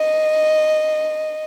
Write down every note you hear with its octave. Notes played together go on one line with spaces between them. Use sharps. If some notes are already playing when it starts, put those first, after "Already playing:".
Already playing: D#5